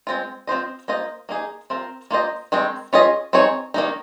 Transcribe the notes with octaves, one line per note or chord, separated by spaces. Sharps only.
G#3 C4 F4
C4 F4 C5 D#5
A#3 F4 C5 D#5
A#3 D#4 G#4
C4 F4 A#4
A#3 F4 C5 D#5
D#3 G#3 C4
C#4 F4 G#4 D#5
C4 D#4 G#4 C#5
D#3 A#3 D#4